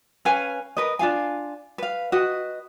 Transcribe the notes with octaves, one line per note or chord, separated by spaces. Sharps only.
C#4 B4 F5 G#5
A#4 B4 D#5
D4 F4 F5 G#5
B4 F5
F#4 B4 D#5